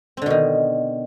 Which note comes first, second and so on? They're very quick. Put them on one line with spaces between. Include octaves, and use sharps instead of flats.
C4 D3 B2 D#3